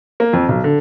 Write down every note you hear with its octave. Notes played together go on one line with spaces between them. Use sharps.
A#3
F2
B1
D3